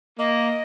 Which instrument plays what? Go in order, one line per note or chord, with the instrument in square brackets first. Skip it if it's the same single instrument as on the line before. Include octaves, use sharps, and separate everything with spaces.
[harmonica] A#3 [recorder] D#5